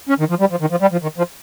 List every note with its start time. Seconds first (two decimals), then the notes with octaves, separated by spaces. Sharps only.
0.09 C#4
0.20 D#3
0.30 F3
0.40 G3
0.51 F3
0.61 D#3
0.71 F3
0.82 G3
0.92 F3
1.02 D#3
1.18 F3